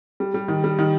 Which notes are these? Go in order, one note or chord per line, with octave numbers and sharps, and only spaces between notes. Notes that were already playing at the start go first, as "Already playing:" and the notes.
G3
G3
D#3
G3
D#3